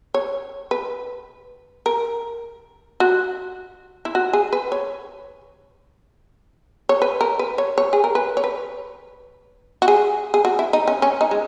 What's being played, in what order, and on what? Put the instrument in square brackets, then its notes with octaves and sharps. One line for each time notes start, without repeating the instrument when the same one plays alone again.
[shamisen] C#5
B4
A#4
F#4
E4
F#4
G#4
B4
C#5
C#5
B4
A#4
B4
C#5
C#5
G#4
A#4
B4
C#5
B4
F#4
G#4
G#4
F#4
E4
D#4
C#4
C#4
D#4
G#3